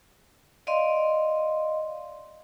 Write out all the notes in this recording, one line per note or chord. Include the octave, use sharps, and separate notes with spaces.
D5 D#5 F5 C6